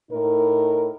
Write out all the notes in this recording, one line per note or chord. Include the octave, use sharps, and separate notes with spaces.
A2 D#4 A#4